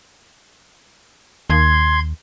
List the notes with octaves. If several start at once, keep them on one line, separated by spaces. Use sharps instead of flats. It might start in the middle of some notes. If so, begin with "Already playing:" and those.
D#2 C6 G#6